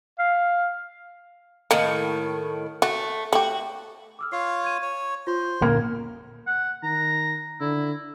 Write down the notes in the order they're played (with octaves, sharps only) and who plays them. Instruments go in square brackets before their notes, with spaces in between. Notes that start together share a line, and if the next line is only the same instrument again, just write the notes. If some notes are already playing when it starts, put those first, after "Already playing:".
[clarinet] F5
[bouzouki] A2 D#3 [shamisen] A#3
[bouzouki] A3 [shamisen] F#4
[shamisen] A3 G4 [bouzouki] F#4
[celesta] D6 E6 F6
[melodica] F4 C#5 [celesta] C7
[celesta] G#6 D#7
[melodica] C#5
[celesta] F4 [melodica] C5
[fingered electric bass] A#2 D3 C#4 [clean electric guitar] A#3 [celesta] G#6
[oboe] F#5
[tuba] D#3 [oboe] A#5
[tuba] D3 [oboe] E4